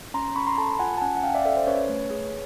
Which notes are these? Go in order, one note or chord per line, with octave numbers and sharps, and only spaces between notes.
C#4 A#5 C6
C#4 B5 C#6
A#5 C6
A4 A5 B5
F4 F#5 G#5
A5
C#4 F#5 G#5
F#5
C#4 F5 G5
D5 E5
F5
A4 D5 E5
C5
C#4 B4 C#5
A3
G#4